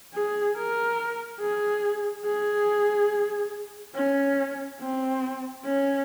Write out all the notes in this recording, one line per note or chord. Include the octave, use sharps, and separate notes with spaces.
G#4
A#4
G#4
G#4
C#4
C4
C#4